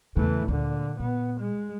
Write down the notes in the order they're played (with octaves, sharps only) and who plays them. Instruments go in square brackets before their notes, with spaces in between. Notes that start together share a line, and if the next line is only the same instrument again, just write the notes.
[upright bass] E2 C#3 [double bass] E3 A3
[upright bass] D2 A3 [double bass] A#2 D3
[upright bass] A#2 [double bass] B3
[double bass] G#3